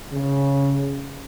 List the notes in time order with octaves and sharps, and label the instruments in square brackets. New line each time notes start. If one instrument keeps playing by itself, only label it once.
[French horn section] C#3